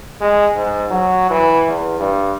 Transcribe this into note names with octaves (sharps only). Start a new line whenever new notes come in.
G#3
G#2
F#3
E3
E2
G2